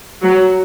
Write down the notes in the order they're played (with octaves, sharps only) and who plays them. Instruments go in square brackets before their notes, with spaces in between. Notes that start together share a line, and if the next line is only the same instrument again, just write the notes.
[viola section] F#3